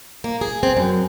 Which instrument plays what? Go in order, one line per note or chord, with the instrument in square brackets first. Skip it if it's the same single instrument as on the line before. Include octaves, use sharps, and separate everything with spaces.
[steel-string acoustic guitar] A#3
G#4
C4
F#2